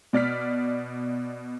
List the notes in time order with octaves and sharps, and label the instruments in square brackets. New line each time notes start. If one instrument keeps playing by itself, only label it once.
[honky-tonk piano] B2 D5 F6 B6